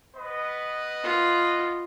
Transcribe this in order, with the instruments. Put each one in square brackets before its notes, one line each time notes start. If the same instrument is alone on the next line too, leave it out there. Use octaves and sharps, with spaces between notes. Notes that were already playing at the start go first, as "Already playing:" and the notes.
[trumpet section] B3 B4 D#5
[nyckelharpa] F4